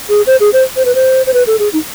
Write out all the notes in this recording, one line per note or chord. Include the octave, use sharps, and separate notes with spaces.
G#4
C5
G#4
C5
C5
B4
C5
C5
B4
A4
G#4
D#4